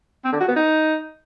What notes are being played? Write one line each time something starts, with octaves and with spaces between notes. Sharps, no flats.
C4
D3
F#4
B3
D#4